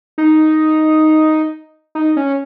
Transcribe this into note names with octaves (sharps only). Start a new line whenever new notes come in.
D#4
D#4
C#4